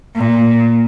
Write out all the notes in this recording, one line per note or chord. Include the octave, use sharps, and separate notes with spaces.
A#2